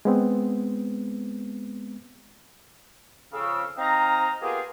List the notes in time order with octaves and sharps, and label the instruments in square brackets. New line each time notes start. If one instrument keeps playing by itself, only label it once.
[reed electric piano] G#3 B3 C4
[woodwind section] F2 C#3 F5 E6
C4 D#4 F5 A#5
A#3 B3 F4 G4 G#4